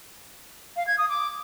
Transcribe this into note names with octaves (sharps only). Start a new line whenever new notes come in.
F5
G#6
D#6
D6